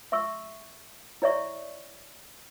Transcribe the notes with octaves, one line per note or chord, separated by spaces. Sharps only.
E5 C6 C#6 E6
E4 C#5 D5 E5 C#6